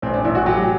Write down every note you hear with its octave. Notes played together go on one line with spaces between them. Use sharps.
A1 C4
D4
A1 E4
F#4
F#3 G4